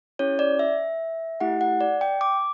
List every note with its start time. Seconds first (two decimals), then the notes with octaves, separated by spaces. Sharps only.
0.19 C#4 E4 G4 C#5
0.39 D5
0.59 E5
1.40 A3 E4 G4 F#5
1.61 F#5
1.81 D5
2.01 G5
2.21 D6